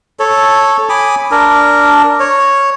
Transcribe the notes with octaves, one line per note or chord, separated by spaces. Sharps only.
A4 C#5
G#5 B5 D6 D#6
D4 A#4
C#5